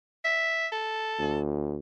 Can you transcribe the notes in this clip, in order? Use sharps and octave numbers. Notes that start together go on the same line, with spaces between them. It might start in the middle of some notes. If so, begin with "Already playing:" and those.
E5
A4
D2